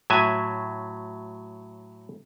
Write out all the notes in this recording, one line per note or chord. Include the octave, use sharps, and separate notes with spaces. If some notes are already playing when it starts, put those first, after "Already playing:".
A2 F#3 E5 G#5